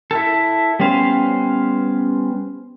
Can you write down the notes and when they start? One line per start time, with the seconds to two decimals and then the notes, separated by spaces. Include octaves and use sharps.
0.11 E4 A4
0.80 G3 B3 C#4 C5 F5